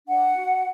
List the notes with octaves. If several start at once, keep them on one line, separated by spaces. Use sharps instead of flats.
D4 F#5
F#4